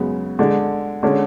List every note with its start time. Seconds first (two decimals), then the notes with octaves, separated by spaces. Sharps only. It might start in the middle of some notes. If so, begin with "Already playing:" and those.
Already playing: F#2 C#3 G#3 B3
0.39 D3 G#3 D4
1.03 D3 G#3 C#4